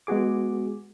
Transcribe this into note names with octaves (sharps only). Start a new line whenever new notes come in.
G#3 B3 F#4 G#4 D6